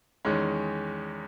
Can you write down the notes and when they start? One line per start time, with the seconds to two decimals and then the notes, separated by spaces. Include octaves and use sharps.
0.25 E2 D#3 G#3 C#4